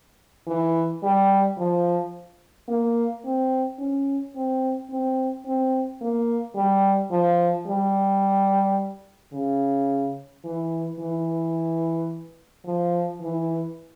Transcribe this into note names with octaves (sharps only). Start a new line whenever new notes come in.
E3
G3
F3
A#3
C4
C#4
C4
C4
C4
A#3
G3
F3
G3
C#3
E3
E3
F3
E3